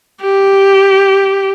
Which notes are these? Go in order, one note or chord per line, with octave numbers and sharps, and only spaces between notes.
G4